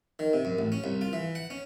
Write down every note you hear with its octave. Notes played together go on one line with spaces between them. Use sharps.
D#3
C3
F#2
A1
C#4
C2
F4
E3
F#5
C#4